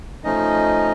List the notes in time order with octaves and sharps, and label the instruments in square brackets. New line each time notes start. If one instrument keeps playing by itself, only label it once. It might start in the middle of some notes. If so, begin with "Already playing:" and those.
[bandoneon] F3 A3 C#4 D#4 D#5